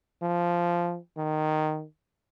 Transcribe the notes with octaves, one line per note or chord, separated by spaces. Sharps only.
F3
D#3